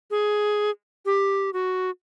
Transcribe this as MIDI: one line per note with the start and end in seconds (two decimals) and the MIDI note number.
0.11 0.70 68
1.06 1.50 67
1.53 1.90 66